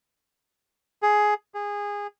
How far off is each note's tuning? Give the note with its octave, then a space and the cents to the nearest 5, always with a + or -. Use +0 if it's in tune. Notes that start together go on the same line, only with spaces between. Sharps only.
G#4 +10
G#4 -20